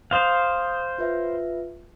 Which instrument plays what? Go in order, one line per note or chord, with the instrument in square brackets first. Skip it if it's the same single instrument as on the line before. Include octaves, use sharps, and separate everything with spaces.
[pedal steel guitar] C5 F5 [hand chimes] D6 D#6
[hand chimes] F4 B4 E5